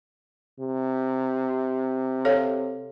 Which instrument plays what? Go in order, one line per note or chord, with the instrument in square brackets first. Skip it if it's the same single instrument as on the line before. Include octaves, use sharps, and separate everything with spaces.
[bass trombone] C3
[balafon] A4 C#5 F5